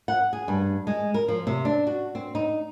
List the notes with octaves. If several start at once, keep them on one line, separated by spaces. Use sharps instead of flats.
F#5
G#4
G2
G#3
A#4
F3
C3
D4
F#4
C4
D#4